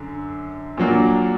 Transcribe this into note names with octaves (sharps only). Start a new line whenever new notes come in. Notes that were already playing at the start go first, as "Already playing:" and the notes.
Already playing: F#2 D3
A#2 F#3 A#3 D4